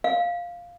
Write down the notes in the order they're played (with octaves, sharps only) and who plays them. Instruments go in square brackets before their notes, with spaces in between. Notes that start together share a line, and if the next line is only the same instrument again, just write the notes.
[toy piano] F5